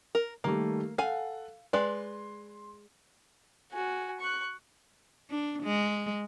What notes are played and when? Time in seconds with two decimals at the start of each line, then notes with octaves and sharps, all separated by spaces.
0.15 A#4
0.44 D#3 G3 A3 A#3
0.98 A4 F5 F#5 G#5
1.73 G#3 B4 D5 C6
3.72 F#4 G#5
4.20 C#6 F#6
5.30 D4
5.63 G#3